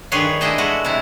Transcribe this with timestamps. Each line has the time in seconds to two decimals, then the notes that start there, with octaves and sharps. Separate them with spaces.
0.11 G2 D#3 G#4 B4 C#5 C6
0.41 D4 E4 G#4 D#5 E5 G5
0.58 G#3 F#4 A4 B4 F#5
0.85 C3 E4